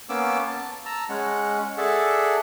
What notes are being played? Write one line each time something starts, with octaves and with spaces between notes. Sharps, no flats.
A#3 B3 C#4 D6 E6
A5
A5 A#5 E6
G#3 C#4 F#5
G#4 A4 D5 E5 F#5 A5